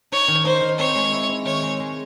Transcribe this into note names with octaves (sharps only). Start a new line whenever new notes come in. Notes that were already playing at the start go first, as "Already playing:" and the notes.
D#4 C#5
D#3
D#4 C5
D#3
C4 C#5
G#3
E4
E4
D#3 C#5
G#3
G#3